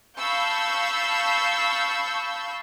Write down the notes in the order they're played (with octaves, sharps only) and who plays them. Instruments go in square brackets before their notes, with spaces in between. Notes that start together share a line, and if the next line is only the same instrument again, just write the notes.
[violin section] F5 A5 B5 C#6 E6 G6